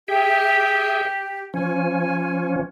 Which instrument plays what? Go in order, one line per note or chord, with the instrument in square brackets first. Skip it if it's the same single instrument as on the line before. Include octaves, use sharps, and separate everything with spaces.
[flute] G4 [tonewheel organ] G#4 E5 G5
[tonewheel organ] F3 C#4 [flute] G#5